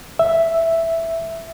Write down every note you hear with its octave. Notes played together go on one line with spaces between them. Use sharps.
E5